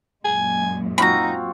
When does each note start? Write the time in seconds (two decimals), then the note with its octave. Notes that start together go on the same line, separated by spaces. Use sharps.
0.25 F#2 A#2 G#3 G#5
0.98 C4 D#4 F4 F#4 A#5 B5